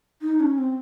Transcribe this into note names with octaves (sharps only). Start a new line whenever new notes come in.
D#4
C#4
C4